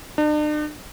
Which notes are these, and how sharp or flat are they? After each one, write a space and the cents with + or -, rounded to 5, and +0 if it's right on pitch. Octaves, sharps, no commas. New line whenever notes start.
D4 +45